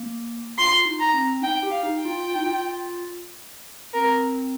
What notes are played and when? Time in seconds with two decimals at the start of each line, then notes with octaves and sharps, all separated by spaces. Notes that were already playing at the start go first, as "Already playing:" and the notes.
Already playing: A#3
0.58 F4 C6
0.85 D#4
1.00 A#5
1.14 C4
1.42 D#4 G5
1.63 G4
1.70 F5
1.83 D#4
1.98 G5
2.05 F4
2.25 F4
2.35 D#4
2.46 F4
3.93 C4 A#4